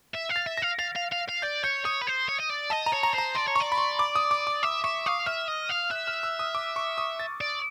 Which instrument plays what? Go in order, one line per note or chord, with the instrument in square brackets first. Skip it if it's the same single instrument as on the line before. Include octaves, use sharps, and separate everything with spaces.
[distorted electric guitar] E5
F5
[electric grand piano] A6
[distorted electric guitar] E5
[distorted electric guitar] F5 [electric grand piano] A#6
[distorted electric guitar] F5 [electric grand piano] A6
[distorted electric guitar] F5
F5
F5
[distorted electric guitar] D5 [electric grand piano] G6
[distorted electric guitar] C#5 [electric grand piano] G6
[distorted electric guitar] C#5 [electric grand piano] D#6
[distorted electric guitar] B4
C5
C#5
D#5
D5
[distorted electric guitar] D#5 [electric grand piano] A5
[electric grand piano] A#5
[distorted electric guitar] C#5
[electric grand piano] A#5
[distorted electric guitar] C5 [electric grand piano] A#5
[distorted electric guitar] D5 [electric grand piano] C6
[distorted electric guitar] C#5
[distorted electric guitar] D5 [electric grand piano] C#6
[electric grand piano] B5
C6
D6
D#6
D6
D6
[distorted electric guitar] E5 [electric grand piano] D6
[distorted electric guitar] E5 [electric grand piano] C#6
[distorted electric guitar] F5 [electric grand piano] D#6
[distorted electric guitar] E5 [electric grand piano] F6
[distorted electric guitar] D#5
F5
[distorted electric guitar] E5 [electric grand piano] F#6
[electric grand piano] F6
E6
D#6
D6
C#6
D#6
A6
[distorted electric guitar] D5